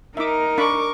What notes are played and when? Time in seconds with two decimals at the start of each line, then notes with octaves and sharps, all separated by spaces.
0.17 D#4 A#4 E5 D6
0.58 D4 B5 C#6 D6